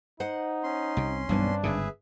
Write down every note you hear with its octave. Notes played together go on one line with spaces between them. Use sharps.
D#4 C5 D#5 F#5
C#4 C6
C2 C3
E1 B1 G2 B3 C4 D4
G1 G#2 C#3 G#4 B4 E5